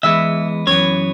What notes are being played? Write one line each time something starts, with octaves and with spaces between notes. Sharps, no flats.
E2 E3 G#3 B3 E5
F#2 E3 B3 C#5